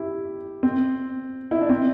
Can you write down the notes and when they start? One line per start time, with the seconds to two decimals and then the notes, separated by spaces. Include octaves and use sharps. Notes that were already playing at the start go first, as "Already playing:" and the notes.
Already playing: E4 G4
0.63 C4
1.51 E4
1.61 D4
1.69 C4